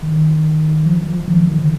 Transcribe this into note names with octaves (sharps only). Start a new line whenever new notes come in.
D#3
F3
F3
D#3
F3
D#3
D3